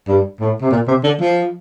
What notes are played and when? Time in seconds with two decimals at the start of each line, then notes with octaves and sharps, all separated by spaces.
0.08 G2
0.40 A2
0.62 C3
0.71 A#2
0.88 C3
1.04 D3
1.20 F3